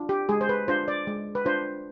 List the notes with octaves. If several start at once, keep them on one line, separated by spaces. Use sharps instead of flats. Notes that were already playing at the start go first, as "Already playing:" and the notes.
Already playing: D4 F4
G4
G#3 G#4
C5
B4
D4 F4 C5
D5
G#3
B4
D4 F4 C5